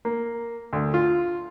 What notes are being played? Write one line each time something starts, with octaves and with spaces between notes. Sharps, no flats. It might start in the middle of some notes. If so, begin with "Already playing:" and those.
A#3
D2
F4